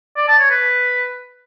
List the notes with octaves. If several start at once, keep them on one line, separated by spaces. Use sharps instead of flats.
D5
A5
C#5
B4